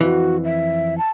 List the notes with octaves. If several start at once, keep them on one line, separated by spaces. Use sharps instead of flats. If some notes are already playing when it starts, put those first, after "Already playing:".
F2 E3 F#4
E5
A5